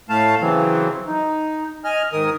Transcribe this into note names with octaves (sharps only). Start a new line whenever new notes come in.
A2 A3 F5 A5
C#3 E3 F#3 C4
D#4
D#5 G#5 F6
G#2 D#3 A#4 D#6